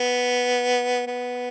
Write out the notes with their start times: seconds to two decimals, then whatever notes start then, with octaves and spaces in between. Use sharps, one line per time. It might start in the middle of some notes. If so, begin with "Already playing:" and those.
Already playing: B3
1.07 B3